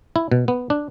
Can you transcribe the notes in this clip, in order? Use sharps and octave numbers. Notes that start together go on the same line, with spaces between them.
E4
B2
B3
D4